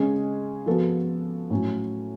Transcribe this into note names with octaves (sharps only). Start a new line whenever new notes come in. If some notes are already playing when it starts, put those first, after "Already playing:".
Already playing: C#3 G#3 C#4 G#4
F3 B3 F#4 A4
A2 F#3 C#4